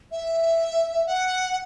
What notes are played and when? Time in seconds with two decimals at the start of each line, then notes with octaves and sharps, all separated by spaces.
0.11 E5
1.06 F#5